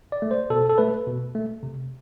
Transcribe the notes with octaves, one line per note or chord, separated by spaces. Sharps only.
D5
A3
C5
B2 A4
A4
A3 B4
B2
A3
C3